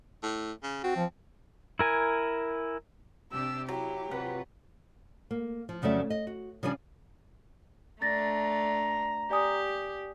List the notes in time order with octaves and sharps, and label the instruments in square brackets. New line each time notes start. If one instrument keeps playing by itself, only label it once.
[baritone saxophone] A2
C#3
[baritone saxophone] C4 [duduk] F#4
[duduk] F3
[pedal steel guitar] E4 A#4 G#5
[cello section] C3 D4 G4 [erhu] E6
[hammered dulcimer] F#3 [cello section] E4 [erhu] G4
[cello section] C3 F4 B4 [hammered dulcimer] F#5
[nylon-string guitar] A#3
F3
F2 C#3 F#3 A3 D5 E5
D#5
F#4
C#3 F3 G3 D4 G#5
[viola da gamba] A3 D4 [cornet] A#5 [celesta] A6 A#6
[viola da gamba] G4 [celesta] D5 G#5 D#6